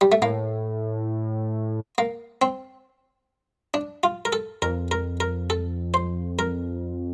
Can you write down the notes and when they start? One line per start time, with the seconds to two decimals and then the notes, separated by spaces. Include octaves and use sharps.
0.01 G3
0.12 A3
0.22 A2 A#3
1.98 A#3
2.42 C4
3.74 D4
4.03 F4
4.25 A#4
4.33 A4
4.62 F2 A#4
4.91 A#4
5.20 A#4
5.50 A4
5.94 C5
6.39 A#4